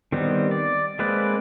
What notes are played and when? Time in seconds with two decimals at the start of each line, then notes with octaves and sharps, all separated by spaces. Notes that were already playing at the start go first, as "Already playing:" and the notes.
0.12 D#3 G3 B3 C4
0.51 D5
0.99 G#3 A#3 C4 B4 D5